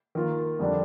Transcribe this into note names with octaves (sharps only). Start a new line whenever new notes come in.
D#3 A#3 F4 A#4
F2 D3 G3 D4